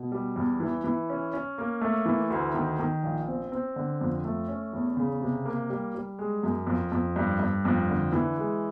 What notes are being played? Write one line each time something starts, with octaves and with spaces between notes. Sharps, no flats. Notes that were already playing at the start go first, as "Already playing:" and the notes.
Already playing: B2
G3
E2
E3
E3
C#4
C#4
A#3
A3
E3
D2
D#3
D#3
A#1
C4
C4
D3
F2
A3
C#4
E2
C#3
C3
A#3
G3
G3
G#3
F#2
F2
F2
G2
G2
F2
D3
E3
G#3